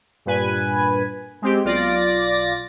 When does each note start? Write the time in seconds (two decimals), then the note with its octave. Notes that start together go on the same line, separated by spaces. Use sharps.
0.26 G2 A#2 B4 G#5
1.42 G#3 C4 G4
1.64 B1 F4 D5 A6 A#6